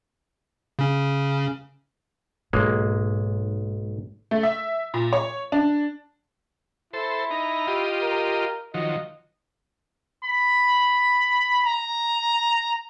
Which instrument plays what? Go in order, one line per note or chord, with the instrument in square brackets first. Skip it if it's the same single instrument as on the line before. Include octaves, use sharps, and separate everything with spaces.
[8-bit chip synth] C#3 C#4
[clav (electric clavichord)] B1 G#3 A#3 [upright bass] G#2
[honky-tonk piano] A3
E5
A#2
C#5
D4
[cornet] E4 [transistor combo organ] A4 C5
[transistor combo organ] D#4 A#5
F4 G4 D#5
[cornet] A#4
[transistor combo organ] D#3 F3 F#3 [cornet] D#5
[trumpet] B5
A#5